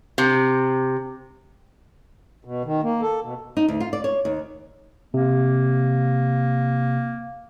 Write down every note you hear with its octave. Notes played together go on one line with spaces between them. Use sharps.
C3
B2
D#3
A#3
A4
B2
D#4
D2
F4
D5
C#5
D#2
C3 A#3